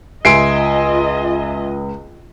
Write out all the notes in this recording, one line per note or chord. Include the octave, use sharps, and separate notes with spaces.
C#2 F4 D#5 E5 G#5 C6 C7 D7